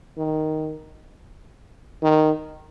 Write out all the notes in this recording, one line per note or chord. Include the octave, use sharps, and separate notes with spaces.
D#3
D#3